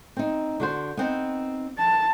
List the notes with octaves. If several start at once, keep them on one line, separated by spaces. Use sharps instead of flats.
C4 D#4
D3 F#4 C5
B3 C4 D#4
A5